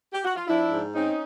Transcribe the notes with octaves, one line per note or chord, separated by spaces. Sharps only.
G4
F#4
F4
F3 D4 E4
G#2
C4 C#4 D#4